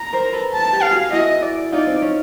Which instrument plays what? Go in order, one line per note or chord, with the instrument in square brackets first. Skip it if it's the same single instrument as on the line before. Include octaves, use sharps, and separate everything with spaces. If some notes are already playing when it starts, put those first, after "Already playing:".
Already playing: [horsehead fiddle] A#5
[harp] A#4 C5
A4 B4
[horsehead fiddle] A5
[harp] G4 A4
[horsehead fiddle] F5
[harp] F#4 G#4
[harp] E4 F#4 [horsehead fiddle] D#5
[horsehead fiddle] D5
[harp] D#4 F4 [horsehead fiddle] D5
[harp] C4
C#4